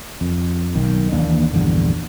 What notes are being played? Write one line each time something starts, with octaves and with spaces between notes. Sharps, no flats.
F2
B1 D#3
D#2 E3 A#3 D4
A#1 E2 G2 D3